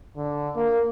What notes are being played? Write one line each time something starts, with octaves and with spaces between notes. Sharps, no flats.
D3
A#3